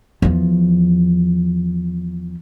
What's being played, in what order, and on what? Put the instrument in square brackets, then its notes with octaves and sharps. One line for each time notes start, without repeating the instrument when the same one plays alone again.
[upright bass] E2 F3